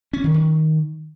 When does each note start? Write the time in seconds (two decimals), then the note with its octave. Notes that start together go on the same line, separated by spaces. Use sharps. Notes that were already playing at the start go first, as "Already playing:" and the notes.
0.13 C#4
0.24 D#3
0.34 D#3